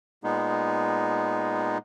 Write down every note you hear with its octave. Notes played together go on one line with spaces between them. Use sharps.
A#2 G#3 B3 D#4